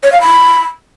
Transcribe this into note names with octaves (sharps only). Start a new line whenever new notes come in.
C#5
F5
B5